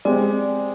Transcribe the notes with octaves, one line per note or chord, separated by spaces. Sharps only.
G#3 C4 G4 D5